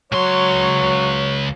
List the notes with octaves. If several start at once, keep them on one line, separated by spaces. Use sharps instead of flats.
C#2 F#3 C#5 C6